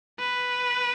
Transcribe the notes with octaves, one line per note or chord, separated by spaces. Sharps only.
B4